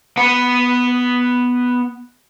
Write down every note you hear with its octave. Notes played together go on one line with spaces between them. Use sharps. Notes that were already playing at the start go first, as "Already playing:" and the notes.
B3 B4 F#5